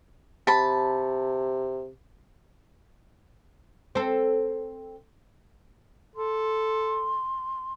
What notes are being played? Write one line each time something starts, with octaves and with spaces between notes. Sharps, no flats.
C3 A5 B5
C4 A4
A4 C6